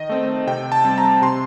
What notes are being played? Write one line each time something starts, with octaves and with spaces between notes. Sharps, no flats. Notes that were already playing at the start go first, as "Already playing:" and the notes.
Already playing: D#3 D#5
A3 C4
C3 G5
A5
G3 C4
A#5
C3 C6